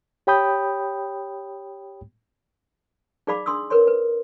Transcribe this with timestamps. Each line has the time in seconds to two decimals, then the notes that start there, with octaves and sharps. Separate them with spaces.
0.27 G4 C#5 G5 B5 D#6 G6
3.27 D#4 G#4 D5 F5 B5 D6
3.46 D4 C6 D#6 E6
3.70 A#4 B4 C#5 C6
3.87 B4